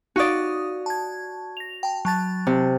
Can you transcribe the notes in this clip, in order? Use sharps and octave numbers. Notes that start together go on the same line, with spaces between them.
D#4 F#4 D5 F5 D#6
A5 G#6
A#6 F7
G5 A5
F#3 A5 A6
C3